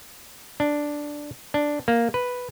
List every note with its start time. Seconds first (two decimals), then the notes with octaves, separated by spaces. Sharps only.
0.60 D4
1.54 D4
1.88 A#3
2.14 B4